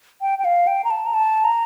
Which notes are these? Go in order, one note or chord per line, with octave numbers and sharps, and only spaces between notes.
G5
G5
F5
G5
A#5
A5
A#5
A5
A#5